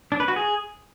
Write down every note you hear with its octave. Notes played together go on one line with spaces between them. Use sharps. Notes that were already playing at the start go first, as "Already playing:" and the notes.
D4
B4
F#4
G#4